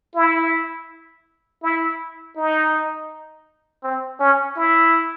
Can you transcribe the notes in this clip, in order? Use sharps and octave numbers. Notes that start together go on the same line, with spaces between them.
E4
E4
D#4
C4
C#4
E4